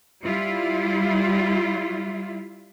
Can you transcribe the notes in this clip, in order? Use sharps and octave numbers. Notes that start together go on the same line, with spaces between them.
G3 E4 F4